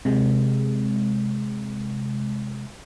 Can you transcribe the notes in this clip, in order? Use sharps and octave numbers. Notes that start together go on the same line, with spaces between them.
C3 G#3